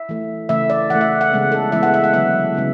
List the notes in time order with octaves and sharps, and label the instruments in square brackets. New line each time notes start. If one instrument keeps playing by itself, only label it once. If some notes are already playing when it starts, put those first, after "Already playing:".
Already playing: [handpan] E5
E3 A3
C#3 E3 A3 E5
D5
E3 F#5
A3
E5
F#5
C#3 G#3 B3
A4
E3 G#3 B3 E5
F#5
E5
F#5
D3 F#3 B3 E5
C#3 G#3 B3